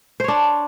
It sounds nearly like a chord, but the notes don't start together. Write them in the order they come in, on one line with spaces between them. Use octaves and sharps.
C5 C#5 D4